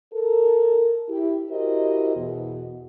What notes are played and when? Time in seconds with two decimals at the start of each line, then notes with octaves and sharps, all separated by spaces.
0.14 A4 A#4
1.09 E4 G4
1.49 E4 F#4 G4 A#4 C5 D#5
2.16 E2 B2